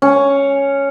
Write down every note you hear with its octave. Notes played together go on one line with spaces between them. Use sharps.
C#4